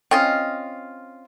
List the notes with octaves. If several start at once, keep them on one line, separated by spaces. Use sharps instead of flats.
C4 C#4 F4 D#5